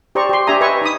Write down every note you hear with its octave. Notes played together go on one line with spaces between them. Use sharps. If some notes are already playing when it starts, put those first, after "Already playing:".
G4 C5 D5 A#5 C#6
G4 C6
D4 G4 E5 G#5 A#5 D#6
B4 D#5 E5 G#5 C#6
D#4 B5 D#6